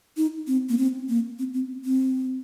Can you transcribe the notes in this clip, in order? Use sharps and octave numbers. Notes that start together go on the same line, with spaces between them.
D#4
C4
A#3
C4
A#3
C4
C4
C4